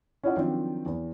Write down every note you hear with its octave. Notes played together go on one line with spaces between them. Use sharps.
C#4 E4 F4 D5 D#5 F#5
D#3 F3 F#3 C4 D4
E2